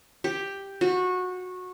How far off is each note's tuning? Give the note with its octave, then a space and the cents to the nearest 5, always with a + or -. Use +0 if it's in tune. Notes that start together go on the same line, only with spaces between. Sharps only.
G4 +5
F#4 -20